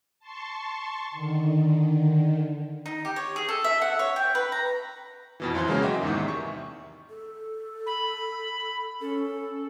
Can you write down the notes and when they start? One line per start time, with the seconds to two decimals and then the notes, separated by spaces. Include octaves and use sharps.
0.19 A5 C6 C#6
1.11 D3 D#3
2.86 D#4
3.05 G4
3.16 C#5
3.36 G#4
3.49 A4
3.64 E5
3.82 F#5
3.99 C#5
4.16 G5
4.35 B4
4.52 A#5
5.40 F2 B2 E3
5.54 F#2 E3 C5 F5 G#5 C6
5.67 C#3 F#3 G#3 A#3 C#4
5.82 F#4 D#5 E5 G5 D6
6.02 E2 G#2 C3 D#3
6.24 E5 C#6
7.10 A4
7.86 B5
9.01 C#4 A4